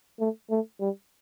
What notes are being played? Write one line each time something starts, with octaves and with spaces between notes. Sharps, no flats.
A3
A3
G3